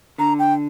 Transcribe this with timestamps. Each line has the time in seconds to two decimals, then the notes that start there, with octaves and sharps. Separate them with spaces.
0.18 D3 A#5
0.39 G5